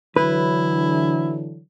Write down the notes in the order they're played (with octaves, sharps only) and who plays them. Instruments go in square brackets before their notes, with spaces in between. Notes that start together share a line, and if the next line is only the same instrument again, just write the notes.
[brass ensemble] D3 E3 F#3 [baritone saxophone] E4 [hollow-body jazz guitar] B4